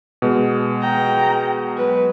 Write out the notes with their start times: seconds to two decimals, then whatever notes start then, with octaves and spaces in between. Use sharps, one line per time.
0.22 B2 G#3
0.81 G5 A#5
1.77 F#3 B4